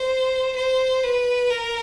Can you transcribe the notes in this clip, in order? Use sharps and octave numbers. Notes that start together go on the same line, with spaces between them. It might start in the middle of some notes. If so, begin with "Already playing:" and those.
Already playing: C5
C5
B4
A#4